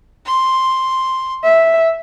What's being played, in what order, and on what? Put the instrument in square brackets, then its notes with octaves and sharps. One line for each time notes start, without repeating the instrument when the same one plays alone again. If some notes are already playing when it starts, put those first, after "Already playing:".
[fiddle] C6
[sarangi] E5